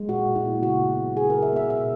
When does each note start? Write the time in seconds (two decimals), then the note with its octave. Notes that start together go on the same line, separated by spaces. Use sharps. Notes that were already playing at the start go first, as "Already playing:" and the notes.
Already playing: G#3
0.08 A#2 F#4
0.26 A#2
0.36 E4
0.45 B3
0.62 C#3 F#4
0.80 B3
0.99 F#3
1.16 C#3 G#4
1.30 C#3 A#4
1.42 E5
1.53 B3 E5
1.70 B2 E5